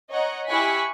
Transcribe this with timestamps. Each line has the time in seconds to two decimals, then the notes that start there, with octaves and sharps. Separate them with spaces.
0.11 C#5 D#5 F#5 A#5
0.49 E4 G4 G#5 C#6 F#6 B6